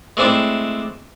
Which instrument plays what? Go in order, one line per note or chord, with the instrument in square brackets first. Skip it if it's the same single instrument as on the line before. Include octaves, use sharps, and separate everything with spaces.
[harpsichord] G#3 A3 C4 D4 E4